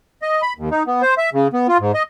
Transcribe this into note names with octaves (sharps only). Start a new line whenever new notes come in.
D#5
B5
D#2
D#4
B3
C5
E5
C#3
B3
F4
G#2
D#5